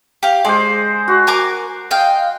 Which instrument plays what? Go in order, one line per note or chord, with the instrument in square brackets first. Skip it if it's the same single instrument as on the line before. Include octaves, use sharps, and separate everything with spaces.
[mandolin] G4 F5
[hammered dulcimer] G#3 C5 [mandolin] D5
[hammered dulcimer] F#4
[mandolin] A#4 G#5 D6
D#5 F5 G5